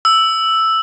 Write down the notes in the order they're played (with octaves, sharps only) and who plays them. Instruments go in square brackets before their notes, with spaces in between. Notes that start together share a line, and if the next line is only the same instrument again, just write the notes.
[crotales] E6